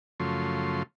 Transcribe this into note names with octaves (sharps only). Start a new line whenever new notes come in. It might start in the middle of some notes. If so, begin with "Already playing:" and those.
F#2 C#3 F3 A3 C6